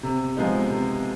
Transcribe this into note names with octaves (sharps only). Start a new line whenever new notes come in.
C3
F3 G#3 B3 D#4
C3